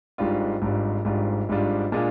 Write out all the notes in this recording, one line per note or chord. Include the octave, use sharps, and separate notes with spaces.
G#1 G#2 G3 D4 F4
G#1 G#2 G3 D4 F4
G#1 G#2 G3 D4 F4
G#1 G#2 G3 D4 F4
A#2 G#3 D4 F4